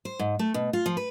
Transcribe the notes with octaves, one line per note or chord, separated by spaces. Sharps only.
C5
G#2
A3
B2
F4
F3
B4